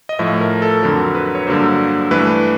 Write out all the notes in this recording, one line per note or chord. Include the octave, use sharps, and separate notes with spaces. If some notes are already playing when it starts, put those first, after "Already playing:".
D#5
A2 F3 A3 E5
A#4
A4
F2 D3 F#3 A#4
B4
C#5
G2 D3 F#3 A#3 C5
G2 E3 A3 B4